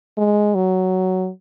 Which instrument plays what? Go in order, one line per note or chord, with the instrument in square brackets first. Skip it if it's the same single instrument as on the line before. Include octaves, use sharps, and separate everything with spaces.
[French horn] G#3
F#3